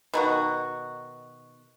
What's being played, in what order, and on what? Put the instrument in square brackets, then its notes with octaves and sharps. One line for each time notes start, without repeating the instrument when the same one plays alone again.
[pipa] B2 D#3 F#4